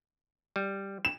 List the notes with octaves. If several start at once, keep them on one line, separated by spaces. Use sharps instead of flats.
G3
E7